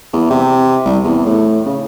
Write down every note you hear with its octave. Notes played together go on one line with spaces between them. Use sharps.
E2
C3
C2
E2
A2
C#3